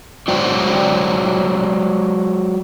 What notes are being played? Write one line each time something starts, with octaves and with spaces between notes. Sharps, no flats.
F#3 G#3 F#4 C5 D5 G5